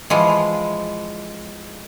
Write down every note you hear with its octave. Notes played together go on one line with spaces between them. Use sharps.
E3 F3 G#3